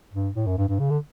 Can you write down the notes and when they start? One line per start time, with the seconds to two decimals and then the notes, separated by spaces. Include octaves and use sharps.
0.14 G2
0.35 A2
0.47 F#2
0.58 G2
0.69 G2
0.79 C#3
0.90 D3